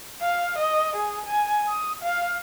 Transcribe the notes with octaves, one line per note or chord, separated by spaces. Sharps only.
F5
D#5
G#4
G#5
D#6
F5